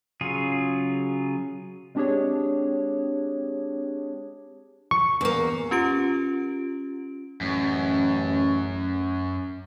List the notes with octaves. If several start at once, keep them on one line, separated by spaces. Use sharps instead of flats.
C#3 F#3 F4 G#4
G#3 C4 D4 G4 G#4 C#5
C#6
E2 A#3
C#4 F4 G4 D7
A1 F#2